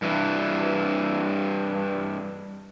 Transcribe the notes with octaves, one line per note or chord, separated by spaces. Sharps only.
G2 E3